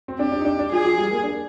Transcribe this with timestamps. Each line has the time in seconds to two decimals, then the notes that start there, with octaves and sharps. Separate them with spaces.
0.08 C4
0.19 D4 G4
0.32 D4
0.40 D#4
0.45 D4
0.59 D4
0.72 F3 G#4
0.84 F3
0.98 G3
1.11 A#3
1.23 D4